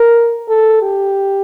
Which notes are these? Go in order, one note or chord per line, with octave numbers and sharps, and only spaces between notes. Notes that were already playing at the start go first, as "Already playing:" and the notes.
Already playing: A#4
A4
G4